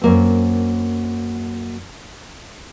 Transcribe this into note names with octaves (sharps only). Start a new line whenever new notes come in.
F#2 A#3 C4